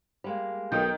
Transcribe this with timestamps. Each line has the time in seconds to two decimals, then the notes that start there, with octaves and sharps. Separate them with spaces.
0.24 G3 G#3 A#3
0.72 B1 D#3 G5